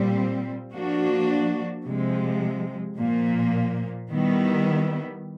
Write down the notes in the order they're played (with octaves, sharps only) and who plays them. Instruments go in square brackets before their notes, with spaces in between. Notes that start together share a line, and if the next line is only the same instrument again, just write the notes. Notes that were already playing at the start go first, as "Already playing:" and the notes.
Already playing: [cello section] A#2 G3 C4
F3 A#3 D4 F#4
C3 F3 G#3
A#2 F3 A#3
D#3 G3 B3 E4